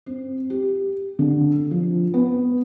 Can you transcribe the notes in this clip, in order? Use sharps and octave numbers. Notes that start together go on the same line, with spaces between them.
C4
G4
D3
F3
B3